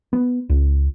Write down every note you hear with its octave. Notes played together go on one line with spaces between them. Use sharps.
B3
C#2